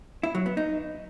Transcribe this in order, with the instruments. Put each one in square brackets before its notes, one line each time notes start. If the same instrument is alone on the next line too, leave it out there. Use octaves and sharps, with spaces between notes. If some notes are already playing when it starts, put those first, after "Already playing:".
[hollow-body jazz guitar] E4
F#3
B3
D#4